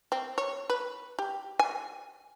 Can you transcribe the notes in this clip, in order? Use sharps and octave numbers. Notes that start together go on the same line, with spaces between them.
C4
C#5
B4
G4
G#5